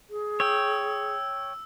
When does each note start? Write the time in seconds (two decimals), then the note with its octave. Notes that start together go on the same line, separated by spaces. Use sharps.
0.10 G#4
0.40 C#5 G5 E6